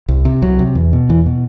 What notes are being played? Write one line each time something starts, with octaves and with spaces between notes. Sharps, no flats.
C2
C3
C2 F#3
C3
E2
B2
E2 E3
B2